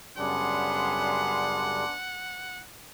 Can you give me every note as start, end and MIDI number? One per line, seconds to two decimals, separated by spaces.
0.18 1.84 42
0.18 1.84 49
0.18 1.84 55
0.18 1.94 59
0.18 1.93 62
0.18 2.62 78
0.18 1.94 80
0.18 1.94 84